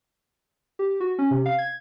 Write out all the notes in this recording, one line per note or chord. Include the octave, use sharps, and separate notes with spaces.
G4
F#4
C#4
C3
F5
G#6